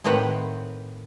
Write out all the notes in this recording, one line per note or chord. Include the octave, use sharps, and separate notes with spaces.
A2 D#3 C4 G4 B4 F#5